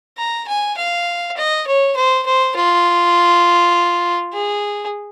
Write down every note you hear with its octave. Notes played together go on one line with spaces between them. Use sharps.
A#5
G#5
F5
D#5
C#5
C5
C5
F4
G#4